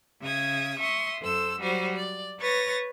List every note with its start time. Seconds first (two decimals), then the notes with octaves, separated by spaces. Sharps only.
0.21 C#3 E5 D#6 G#6
0.80 E5 C6 C#6 D#6
1.20 F#2 A4 C5 E6
1.58 F#3 G3 F#4 C5
1.95 D5
2.39 B4 C#5 C#6 A6 A#6